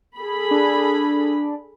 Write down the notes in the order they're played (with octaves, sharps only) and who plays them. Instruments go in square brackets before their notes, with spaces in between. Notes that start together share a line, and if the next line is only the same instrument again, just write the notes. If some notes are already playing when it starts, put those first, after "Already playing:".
[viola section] G#4 A4 B5
[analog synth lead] D4